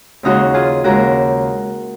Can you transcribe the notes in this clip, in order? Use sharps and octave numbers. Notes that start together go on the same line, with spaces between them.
D#2 C#3 F3 G#3 D#4 F#4
F4 G#4
D#2 C#3 F3 G#3 F#4 A#4